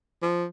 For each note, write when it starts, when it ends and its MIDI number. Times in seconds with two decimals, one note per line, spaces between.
0.22 0.45 53